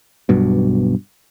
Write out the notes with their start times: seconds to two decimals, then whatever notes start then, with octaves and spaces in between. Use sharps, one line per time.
0.29 B1 G2 B2